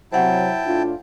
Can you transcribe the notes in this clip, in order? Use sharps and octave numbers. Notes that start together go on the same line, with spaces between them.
C3 F#3 E4 C5 F#5 G5 A5
A2 D4 F4